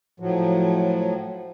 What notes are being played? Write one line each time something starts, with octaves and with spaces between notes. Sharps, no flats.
A2 F3 F#3